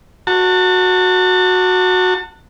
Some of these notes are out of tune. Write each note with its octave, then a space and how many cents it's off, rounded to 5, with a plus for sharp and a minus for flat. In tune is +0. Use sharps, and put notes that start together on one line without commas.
F#4 -10 A5 +35